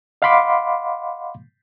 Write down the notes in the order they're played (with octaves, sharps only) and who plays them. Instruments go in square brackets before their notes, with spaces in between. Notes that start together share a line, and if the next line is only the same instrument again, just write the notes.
[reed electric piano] D#5 F5 F#5 B5 C6 D6